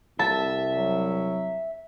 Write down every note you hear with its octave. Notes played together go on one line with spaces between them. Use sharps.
C2 C3 E5 A5
F#3